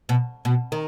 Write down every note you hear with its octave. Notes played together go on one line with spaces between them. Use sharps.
B2
B2
D#3